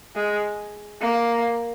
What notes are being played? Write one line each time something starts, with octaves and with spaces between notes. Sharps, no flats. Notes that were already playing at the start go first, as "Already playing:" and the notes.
G#3
A#3